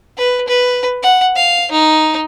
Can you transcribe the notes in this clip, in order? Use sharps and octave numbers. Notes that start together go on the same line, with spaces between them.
B4
B4
F#5
F5
D#4